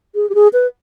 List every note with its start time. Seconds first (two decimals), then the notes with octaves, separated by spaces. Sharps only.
0.15 G#4
0.30 G4
0.35 G#4
0.53 B4